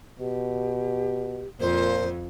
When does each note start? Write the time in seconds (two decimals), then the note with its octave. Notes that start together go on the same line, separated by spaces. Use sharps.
0.20 B2 G4
1.61 F2 A#2 A#4 C5